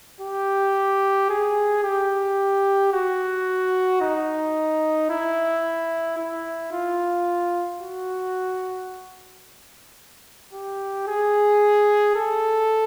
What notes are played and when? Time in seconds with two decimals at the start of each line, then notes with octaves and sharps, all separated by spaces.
0.21 G4
1.30 G#4
1.84 G4
2.93 F#4
4.01 D#4
5.10 E4
6.18 E4
6.72 F4
7.82 F#4
10.53 G4
11.07 G#4
12.15 A4